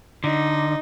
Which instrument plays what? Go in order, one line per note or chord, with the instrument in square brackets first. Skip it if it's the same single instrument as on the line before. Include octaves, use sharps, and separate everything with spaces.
[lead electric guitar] D3 [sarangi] D#4